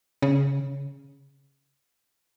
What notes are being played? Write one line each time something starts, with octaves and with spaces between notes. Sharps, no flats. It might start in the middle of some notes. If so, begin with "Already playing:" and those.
C#3